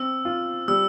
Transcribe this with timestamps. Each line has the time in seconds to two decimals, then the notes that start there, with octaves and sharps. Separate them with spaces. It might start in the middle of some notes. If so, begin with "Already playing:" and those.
Already playing: C4 E6
0.25 F4
0.68 G3 E6